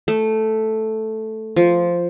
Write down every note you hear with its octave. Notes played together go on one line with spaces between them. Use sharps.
A3
F3